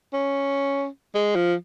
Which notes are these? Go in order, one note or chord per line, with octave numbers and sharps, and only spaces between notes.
C#4
G#3
F3